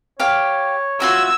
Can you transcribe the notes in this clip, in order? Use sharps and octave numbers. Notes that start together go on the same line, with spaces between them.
G4 C#5 F5
F4 F#4 E5 E6 G#6